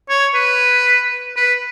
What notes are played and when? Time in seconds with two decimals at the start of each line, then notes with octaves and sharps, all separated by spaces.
0.10 C#5
0.35 B4
1.36 B4